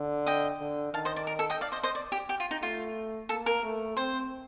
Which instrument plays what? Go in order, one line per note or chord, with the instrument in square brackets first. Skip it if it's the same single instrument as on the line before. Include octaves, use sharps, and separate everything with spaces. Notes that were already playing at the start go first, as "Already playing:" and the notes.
Already playing: [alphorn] D3
[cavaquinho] D#5 G5
[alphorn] D3
[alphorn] D#3 [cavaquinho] F5 A5
[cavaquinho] C5 D#5
D5
A#4
A4
D#5 G5
D5 F5
C5 D#5
C5 D#5
D5
G4
G4
F4
D#4
[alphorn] A3 [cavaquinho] F4
[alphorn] A#3 [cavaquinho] A4
[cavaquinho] A#4
[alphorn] A3
[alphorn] C4 [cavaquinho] C5